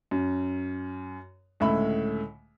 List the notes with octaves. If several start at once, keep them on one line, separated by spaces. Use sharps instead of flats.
F#2
C#2 A2 D3 E5 B5